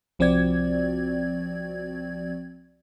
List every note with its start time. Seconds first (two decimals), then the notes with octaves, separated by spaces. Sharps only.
0.19 C2 F3 C4 F#4 D5 G#6